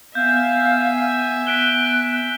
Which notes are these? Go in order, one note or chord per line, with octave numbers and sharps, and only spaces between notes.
B3 E5 F5 G#5 G6
F#6 B6 D7 G7